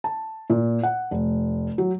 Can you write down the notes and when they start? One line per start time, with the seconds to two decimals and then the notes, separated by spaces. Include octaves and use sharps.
0.04 A5
0.50 A#2
0.83 F#5
1.11 F1
1.78 F#3